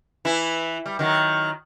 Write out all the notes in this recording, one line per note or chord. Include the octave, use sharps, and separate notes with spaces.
E3 E4
G3
D#3 F#3